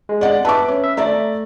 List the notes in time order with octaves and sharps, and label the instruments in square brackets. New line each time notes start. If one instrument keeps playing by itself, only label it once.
[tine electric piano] G#3
[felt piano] D5 D#5 F#5
[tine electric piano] B4 E5 [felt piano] A5 D6
[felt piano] C#4
[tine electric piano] E5
[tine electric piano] A3 [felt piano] D5 E5 A#5